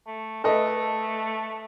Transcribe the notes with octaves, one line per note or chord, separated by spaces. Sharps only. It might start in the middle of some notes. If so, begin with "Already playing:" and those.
A3
A3 A4 B4 D#5